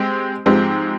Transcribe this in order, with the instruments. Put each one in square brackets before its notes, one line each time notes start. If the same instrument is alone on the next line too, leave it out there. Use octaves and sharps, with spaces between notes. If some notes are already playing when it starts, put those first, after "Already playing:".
Already playing: [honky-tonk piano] G#3 C4 G4
G#2 F3 G#3 C4 G4